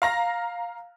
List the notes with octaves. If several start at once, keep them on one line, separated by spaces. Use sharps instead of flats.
F5 A#5 A#6